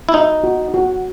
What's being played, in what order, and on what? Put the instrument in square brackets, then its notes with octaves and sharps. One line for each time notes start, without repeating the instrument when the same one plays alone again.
[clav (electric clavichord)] E4
[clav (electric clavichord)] D#4 [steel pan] F#4
[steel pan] F#4
F#4